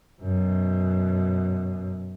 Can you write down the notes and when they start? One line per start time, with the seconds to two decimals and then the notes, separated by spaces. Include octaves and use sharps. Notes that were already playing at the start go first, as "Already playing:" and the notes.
0.22 F#2 B2